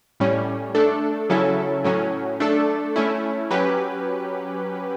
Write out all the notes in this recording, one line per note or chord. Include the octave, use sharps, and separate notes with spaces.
A2 G3 C#4
A3 D4 A4
C#3 F#3 C#4 E4 A4
A2 F#3 C#4
A3 D4 A4
A3 C#4 E4
F#3 C#4 G4 B4